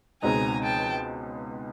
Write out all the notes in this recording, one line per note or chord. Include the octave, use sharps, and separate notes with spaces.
C#2 B2 G#3 C4 D#4 G#5 A#5
G5 A5